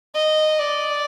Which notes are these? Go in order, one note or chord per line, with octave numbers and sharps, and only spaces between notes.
D#5
D5